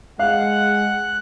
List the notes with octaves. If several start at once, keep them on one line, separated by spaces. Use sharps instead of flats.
G#3 F5 F#5 F#6